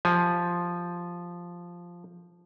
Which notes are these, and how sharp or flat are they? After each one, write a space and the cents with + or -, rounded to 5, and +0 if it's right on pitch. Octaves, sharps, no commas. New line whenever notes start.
F3 +0 G4 +0 G#5 +10